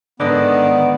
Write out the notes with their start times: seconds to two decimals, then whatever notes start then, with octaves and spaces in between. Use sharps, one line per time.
0.20 G#2 D3 D#3 B3 B4 D5 D#5